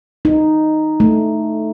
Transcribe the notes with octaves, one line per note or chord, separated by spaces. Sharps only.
D#4
A3